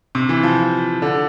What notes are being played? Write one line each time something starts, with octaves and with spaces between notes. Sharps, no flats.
C3
E3
F3
D3